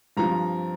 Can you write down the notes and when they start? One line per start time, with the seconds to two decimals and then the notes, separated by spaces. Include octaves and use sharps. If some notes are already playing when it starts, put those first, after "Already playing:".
0.17 G2 F3 C4 A#5